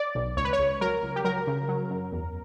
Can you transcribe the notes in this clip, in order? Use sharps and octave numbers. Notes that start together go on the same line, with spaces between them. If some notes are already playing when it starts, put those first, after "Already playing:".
Already playing: D5
B1
C#2 C#5
B4
C#5
C#2
F#3 A#4
C#2
G4
F#3 A#4
C#3
F#3
F#2
E2